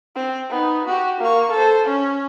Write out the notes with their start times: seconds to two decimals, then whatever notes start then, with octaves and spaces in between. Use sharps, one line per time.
0.16 C4
0.50 B3 D#4
0.87 F#4 G4
1.21 A#3 C#6
1.52 A4 C5
1.85 C#4